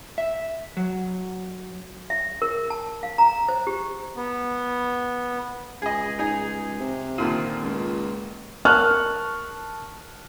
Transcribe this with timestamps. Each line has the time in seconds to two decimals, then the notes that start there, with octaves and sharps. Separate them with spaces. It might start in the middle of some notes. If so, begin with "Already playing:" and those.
0.18 E5
0.77 F#3
2.10 E5
2.42 A#4
2.70 A5
3.03 F5
3.18 A#5
3.49 C5
3.67 G4
4.16 B3
5.82 C#2 G#4 D#5
6.19 D#4 G#4
6.80 C3
7.18 A#2 D3 D#3
7.63 C#2
8.65 A#4 A5 C#6 F6 F#6